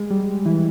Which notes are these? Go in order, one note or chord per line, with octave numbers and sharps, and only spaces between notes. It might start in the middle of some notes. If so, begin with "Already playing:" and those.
Already playing: G#3
G3
E3